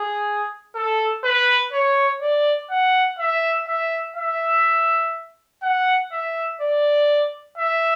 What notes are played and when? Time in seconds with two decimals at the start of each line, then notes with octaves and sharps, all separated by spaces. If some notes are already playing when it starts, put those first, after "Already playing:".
Already playing: G#4
0.75 A4
1.24 B4
1.73 C#5
2.22 D5
2.70 F#5
3.19 E5
3.68 E5
4.16 E5
5.63 F#5
6.12 E5
6.61 D5
7.58 E5